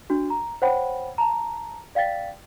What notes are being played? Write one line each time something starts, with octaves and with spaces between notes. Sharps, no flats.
D4 F#4
A#5
C5 C#5 F#5 G5 B5
A5 A#5
D5 F5 G5 A6 B6